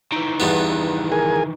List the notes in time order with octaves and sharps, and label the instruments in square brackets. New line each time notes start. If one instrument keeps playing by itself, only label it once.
[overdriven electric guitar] D#3 E3
[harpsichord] E2 G2 B3
[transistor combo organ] G#4 A#4 G#5